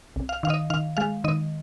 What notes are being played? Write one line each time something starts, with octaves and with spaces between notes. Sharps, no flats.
C2
F5
D#3 F5
D#5
D#3 F5
G#3 F5
D#3 D#5